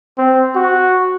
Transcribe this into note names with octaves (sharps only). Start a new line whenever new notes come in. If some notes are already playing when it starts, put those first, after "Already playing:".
C4
F#4